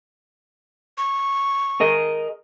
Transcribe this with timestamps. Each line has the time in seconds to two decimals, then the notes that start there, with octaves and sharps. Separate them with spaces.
0.98 C#6
1.80 G#4 A#4 D#5